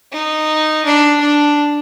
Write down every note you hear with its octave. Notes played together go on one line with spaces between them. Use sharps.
D#4
D4
D4